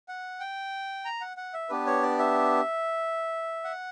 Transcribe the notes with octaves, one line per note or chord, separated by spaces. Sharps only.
F#5
G5
A#5
F#5
F#5
E5
B3 D4 G4 B4
C#5
D5
E5
F#5